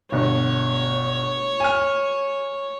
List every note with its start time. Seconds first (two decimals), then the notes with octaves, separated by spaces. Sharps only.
0.12 G1 B2 C#5
1.60 G#5 F6